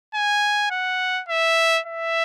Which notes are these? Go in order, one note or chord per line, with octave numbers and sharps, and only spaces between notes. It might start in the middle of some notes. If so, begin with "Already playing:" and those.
G#5
F#5
E5
E5